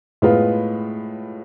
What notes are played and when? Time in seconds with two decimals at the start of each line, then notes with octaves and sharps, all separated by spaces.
0.22 A2 G#3 B3 F4 B4